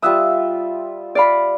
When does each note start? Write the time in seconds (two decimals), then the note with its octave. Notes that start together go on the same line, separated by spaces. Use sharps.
0.02 G3 F4 E5 D#6 E6 F#6
1.15 D5 F5 B5